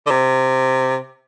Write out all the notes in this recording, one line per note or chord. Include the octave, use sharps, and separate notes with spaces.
D3
C3